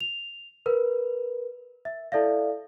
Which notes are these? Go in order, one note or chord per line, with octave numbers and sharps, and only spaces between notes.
F7
A#4 B4
E5
E4 A4 D5 E5 F5